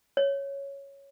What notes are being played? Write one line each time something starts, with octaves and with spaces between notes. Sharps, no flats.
C#5